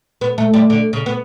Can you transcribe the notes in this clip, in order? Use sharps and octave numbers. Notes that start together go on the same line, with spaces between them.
B3
A3
G3
D3
C#3
B3